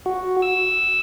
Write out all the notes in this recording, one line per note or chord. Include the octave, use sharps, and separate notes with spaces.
F#4
E6